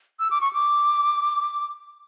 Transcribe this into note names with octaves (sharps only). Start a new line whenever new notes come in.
E6
D6
C#6
D6